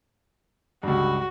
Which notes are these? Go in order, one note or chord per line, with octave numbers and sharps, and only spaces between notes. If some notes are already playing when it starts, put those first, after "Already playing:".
C#2 G2 F#4